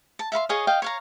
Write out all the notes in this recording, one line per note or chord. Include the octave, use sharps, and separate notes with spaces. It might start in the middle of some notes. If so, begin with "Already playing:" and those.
A5
E5 F5 B5 C6
G#4 C#5 D#5 F5
D#5 F5 G5
C#5 F5 A#5